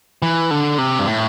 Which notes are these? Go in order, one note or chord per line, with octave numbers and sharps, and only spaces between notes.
E3
D3
C3
G2
A2